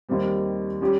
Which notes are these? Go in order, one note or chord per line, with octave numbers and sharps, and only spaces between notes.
D#2 D#3 G3 C4
G3 C#4 G4